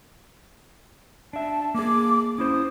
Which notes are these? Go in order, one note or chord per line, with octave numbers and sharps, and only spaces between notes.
D4 E5 A5
A#3 G#4 D6
C#4 E4 C5 D#6